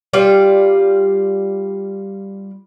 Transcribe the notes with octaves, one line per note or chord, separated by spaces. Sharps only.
G3 F4 D5